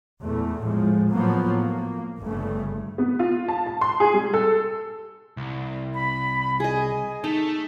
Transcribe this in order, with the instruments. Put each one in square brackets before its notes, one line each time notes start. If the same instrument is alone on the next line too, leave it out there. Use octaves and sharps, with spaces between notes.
[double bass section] E2 A#2 A3
A2 F3 G#3
A2 F3 F#3 A#3 B3
A#3
G1 G2 C#3 A3
[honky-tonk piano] B3
F4
A5
A5
C6
G#4
G3
A4
[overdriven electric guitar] C2
[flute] B5
[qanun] G#4 D#5 [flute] G#5
[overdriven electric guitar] A3 [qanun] D#4 [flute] A5